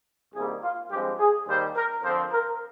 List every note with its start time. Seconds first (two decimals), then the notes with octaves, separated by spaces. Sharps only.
0.34 C2 C3 D#3 G3 A#3 G#4
0.63 F4
0.91 G2 F3 G#3 C4 G4
1.19 G#4
1.48 D#2 D#3 G3 C5
1.76 A#4
2.03 F2 D3 F3 C4 C5
2.32 A#4